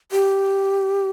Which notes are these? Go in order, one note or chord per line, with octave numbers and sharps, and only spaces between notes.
G4